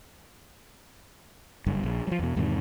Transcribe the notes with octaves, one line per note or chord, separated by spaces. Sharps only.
F#1 G2
A#1
F3 G3
E2 B2
E2 G#2 C3 D#3